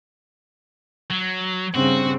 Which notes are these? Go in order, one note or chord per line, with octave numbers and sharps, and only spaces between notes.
F#3
G2 C#3 C4 F#4